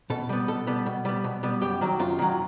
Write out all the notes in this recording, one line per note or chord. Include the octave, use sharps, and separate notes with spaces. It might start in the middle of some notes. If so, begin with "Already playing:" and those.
B2 A4
G3 B3
B2 A4
G3 B3
B2
G3 B3
B2
G3 B3
F#2 G4
D#3 F#3
F#2 F4
D#3 F#3